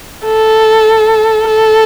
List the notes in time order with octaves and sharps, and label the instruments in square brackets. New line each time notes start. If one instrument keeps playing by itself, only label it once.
[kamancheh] A4
A4